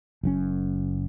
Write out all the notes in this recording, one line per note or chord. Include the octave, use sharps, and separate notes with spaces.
F#1 F#2 C#4